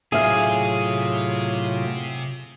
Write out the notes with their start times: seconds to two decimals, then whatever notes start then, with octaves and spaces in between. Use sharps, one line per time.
0.12 A2 C3 F#3 F4 G#4 E5 F5